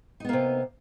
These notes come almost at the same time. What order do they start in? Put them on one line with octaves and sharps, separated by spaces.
D#4 B3 A#3 C3